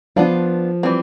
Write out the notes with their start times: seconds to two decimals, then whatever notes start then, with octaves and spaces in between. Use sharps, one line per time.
0.16 F3 B3 D4 F4
0.83 E3 G3 C4